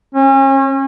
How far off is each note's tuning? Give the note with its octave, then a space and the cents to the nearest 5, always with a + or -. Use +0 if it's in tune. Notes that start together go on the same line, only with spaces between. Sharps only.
C#4 -35